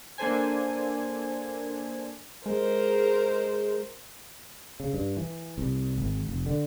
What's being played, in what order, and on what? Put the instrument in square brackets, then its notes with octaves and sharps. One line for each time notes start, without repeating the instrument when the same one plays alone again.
[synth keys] A#3 D4 A4 C5 G#5
[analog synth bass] G#3 [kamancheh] A#4 C5
[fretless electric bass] C#3
G2
E3
C2
G#1
F1
D3